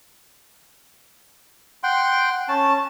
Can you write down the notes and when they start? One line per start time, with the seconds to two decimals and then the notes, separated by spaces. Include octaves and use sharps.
1.83 F#5 G5 C6
2.48 C#4 A5